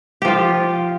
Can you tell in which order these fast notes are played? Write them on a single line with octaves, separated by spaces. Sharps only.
G4 F3 F4